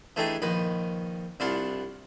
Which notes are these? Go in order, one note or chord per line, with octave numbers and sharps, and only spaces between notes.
E3 A3 D4 D#4 G4 G#4
A#1 D#3 D#4 B4
C2 D4 E4 F4 F#5